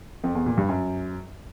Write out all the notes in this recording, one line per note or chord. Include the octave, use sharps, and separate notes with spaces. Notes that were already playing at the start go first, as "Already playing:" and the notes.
F2
E2
A#2
G2
F#2